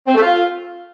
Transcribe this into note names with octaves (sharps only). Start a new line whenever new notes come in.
C4
A3
F4